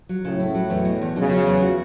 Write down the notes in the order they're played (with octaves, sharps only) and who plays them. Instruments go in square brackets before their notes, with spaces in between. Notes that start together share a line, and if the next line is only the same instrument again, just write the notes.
[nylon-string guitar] F#3
[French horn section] A2 [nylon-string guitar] C#3
[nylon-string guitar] E4
F#3
E2
B2
E2
[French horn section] C#3 [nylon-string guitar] F#3
[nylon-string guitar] F#3
E2
F#4